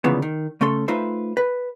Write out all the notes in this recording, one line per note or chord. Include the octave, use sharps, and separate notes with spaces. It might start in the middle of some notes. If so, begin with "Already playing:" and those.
D2 A#2 C#3 E3 F3 B3
D#3
C#3 A3 C#4 A4 C6
A3 D#4 F4 B4 C5 E5
B4